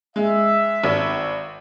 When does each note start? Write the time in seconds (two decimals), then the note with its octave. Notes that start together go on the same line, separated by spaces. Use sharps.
0.16 G#3 E5
0.84 G#1